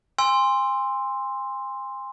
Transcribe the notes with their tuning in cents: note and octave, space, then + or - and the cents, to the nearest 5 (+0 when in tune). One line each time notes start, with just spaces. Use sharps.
G#5 -35 C6 +0 E6 +10